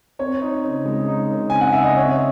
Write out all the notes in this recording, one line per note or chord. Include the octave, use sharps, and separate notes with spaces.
C4 C#5
D#4
C#3
G#3
D#4
C#3
C4 G#5
F#5
C#3 E5
D#5
C4 C#5